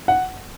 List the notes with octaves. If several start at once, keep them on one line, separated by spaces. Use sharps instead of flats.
F#5